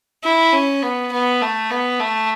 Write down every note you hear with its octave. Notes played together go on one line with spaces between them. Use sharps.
E4
C#4
B3
B3
A3
B3
A3